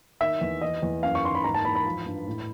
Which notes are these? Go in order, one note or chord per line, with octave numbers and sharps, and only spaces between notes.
D#3 E5
E2
E3 D#5
E2
F#2 F5
C#6
D#3 C6
B5
G#2 A#5
A5
E3 B5
B5
F3
G2
A2